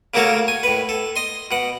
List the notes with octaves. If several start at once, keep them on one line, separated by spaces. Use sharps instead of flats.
C#3 A3 A#3 F#4 A4 C#5
G#5
A2 B4
A4
D#5 C6
B2 F#5